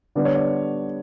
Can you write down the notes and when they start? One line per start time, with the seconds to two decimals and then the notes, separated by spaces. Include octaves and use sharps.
0.15 D3 G3 B3 D4 D5
0.25 C#5
0.35 D5